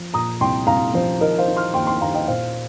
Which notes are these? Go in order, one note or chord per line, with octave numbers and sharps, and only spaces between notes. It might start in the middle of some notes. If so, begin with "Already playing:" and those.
Already playing: F3
A#2 A#5 D#6
C2 G5 C6
C2 F5 A#5
F3 C5
D#3 A#4 D#5
C5 F5
D#3
C6 F6
D#2 G5 C6
G5 C6
D#2 F5 A#5
D#5 G5
A#2 C5 F5